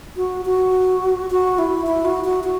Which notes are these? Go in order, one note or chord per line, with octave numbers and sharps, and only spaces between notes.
F#4
F#4
F#4
E4
E4
F#4
F#4
F#4